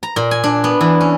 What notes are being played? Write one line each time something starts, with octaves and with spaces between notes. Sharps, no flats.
A#5
A#2
G#5
D4
B3
E3
C#4